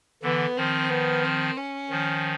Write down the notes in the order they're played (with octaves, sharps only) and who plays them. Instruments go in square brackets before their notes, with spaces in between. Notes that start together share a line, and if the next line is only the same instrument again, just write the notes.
[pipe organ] D3 E3 [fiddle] B3
[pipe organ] D#3 F3 [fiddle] C4
[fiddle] B3
C4
C#4
[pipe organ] D#3 F3